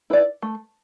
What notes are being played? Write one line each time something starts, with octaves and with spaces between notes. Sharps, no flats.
E4 B4 D5
A3